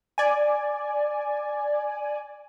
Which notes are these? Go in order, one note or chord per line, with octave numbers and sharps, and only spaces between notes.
D5 G#5